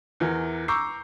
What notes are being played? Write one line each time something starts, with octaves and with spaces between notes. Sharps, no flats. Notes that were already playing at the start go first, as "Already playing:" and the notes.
E2 E3 A#4
A#5 C#6 D6 E6 G6 C7